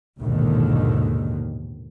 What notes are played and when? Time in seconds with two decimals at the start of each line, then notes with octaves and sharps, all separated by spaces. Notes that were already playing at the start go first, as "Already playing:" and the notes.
0.19 A#1 D#2 G#2 B2 D3 D#3